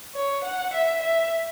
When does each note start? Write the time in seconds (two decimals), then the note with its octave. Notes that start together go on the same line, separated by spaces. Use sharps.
0.15 C#5
0.44 F#5
0.74 E5
1.03 E5